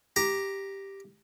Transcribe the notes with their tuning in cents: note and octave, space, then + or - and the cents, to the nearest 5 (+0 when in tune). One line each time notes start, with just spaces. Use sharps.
G4 +0 A#5 +5